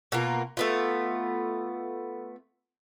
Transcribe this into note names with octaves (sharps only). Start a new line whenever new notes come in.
B2 A#3 F4
A3 B3 F4